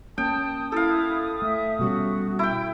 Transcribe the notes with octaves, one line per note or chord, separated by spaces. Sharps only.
A#3 C#4 G5 A5 D#6
E4 A4 F5
A3 E5
B2 G3 C#4 F#4
E4 G5